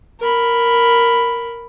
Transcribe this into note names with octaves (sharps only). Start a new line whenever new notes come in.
A#4 B5